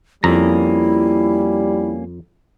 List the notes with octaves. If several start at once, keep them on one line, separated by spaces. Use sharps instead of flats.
F2 G3 A#3 C#4 E4 A#5